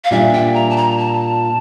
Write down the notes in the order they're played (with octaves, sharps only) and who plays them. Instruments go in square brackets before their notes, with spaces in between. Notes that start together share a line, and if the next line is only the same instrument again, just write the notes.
[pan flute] F5
[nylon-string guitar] A#2 G3 D4 [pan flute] E5
[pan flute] G5
A#5
A5
A#5
A5